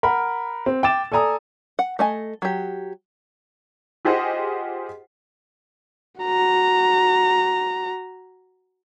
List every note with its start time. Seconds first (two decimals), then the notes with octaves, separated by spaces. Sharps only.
0.03 A#4 F#5 B5
0.66 C4
0.83 G5 D6 A6 E7
1.12 A4 D5 G#5 A#5 D#6
1.79 F#5
1.99 A3 D#5 G#5
2.42 F#3 G4
4.05 F4 G4 G#4 C5 D#5 F#5
6.21 F#4 A#5